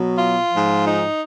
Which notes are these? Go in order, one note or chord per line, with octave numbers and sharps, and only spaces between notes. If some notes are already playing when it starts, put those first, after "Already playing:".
Already playing: B2 F#3
F4
G#2 F3
D#4